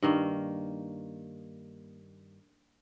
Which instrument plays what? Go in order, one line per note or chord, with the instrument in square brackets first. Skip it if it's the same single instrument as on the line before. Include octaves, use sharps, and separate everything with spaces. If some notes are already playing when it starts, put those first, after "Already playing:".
[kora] G2 D#3 A#3